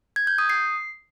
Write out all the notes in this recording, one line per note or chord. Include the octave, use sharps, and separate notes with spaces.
G#6
G6
D#6
C7